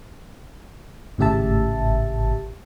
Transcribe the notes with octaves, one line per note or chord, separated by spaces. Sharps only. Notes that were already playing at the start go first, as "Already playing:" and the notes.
G#1 A2 C#3 G4 E5 A5